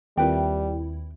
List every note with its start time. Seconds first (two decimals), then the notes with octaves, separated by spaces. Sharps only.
0.17 D#2 G3 C4 E4 F4 A#4 B4 G5